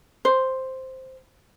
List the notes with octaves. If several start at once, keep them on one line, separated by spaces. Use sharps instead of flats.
C5